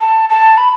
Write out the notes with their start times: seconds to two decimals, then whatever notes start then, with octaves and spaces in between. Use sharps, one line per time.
0.01 A5
0.30 A5
0.57 B5